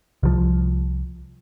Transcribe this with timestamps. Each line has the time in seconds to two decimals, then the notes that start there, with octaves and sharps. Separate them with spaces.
0.23 C2 F3